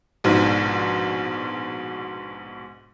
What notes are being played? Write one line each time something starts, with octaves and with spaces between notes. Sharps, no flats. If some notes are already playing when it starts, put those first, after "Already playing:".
A#1 G#2 B2